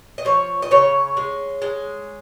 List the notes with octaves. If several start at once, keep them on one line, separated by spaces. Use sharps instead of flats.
D#5
F3 C#5
D#5
C#3 C#5
G#3
G#3